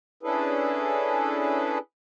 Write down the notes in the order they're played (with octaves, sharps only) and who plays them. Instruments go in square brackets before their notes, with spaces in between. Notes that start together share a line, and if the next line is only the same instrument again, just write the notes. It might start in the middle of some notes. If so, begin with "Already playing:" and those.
[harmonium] C#4 D4 E4 G#4 A4 B4